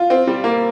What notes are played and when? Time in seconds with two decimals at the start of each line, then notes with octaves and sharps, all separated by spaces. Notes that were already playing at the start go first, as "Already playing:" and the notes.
Already playing: F4
0.10 C4
0.27 G3
0.44 A#3